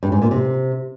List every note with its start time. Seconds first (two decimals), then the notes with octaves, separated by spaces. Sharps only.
0.03 G2
0.12 G#2
0.22 A#2
0.31 C3